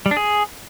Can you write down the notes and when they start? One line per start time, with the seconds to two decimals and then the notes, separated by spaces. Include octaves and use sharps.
0.06 G3
0.11 D4
0.17 G#4